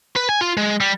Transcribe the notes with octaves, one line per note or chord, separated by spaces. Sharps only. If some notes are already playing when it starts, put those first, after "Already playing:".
B4
G#5
F4
G#3
G3